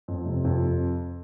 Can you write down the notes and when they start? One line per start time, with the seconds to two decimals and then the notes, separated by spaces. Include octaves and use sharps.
0.08 F2
0.26 C3
0.45 F2